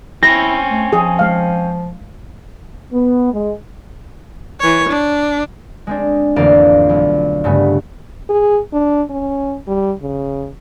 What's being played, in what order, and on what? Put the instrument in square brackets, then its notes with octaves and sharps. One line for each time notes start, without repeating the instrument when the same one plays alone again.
[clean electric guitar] C4 C#4 [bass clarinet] E4 [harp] A#6
[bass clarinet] A3
[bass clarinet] F3 [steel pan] G#4
[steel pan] G#3 F5
[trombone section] B3
G#3
[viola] E3 C#5
D4
[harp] G#3 C4 D4
A1 F2 D3 A#3 D5 F5
B1
G2 C#3 A3 B3
[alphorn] G#4
D4
C#4
G3
C#3